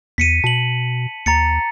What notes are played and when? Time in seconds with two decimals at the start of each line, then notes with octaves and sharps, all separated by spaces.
0.18 E2 B6 C#7 D#7
0.44 B2 A5 F#7
1.26 D#2 A#5 A6 C#7